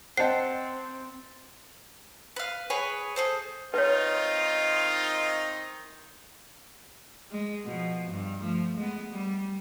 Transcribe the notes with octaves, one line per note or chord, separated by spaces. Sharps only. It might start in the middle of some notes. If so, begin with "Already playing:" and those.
C4 C5 D#5 F#5 G5 A5 C7
B4 F5
G#4 B4 C#5 G#5
G#4 A4 C5
D#3 C4 D#4 F4 B4 C#5
G#3
B2 F3
G2
F3 A3
G#3 B3
G3